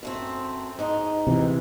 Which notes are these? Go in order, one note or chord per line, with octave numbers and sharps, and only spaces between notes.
F#2 A3 C4
G#2 D#4
C3 E3